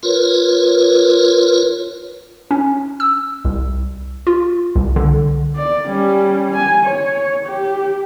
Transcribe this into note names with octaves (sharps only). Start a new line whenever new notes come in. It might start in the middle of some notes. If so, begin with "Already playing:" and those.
F4 A#4 B4 C#5
C#4
E6
C2
F4
C2
D3
D5
G3 C#4
G#5
C#5
G4